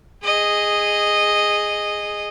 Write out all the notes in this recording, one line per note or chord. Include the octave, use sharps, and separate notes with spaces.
G#4 D#5